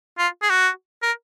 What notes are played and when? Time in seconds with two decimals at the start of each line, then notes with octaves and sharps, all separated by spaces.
0.18 F4
0.42 G#4
0.50 F#4
1.02 A#4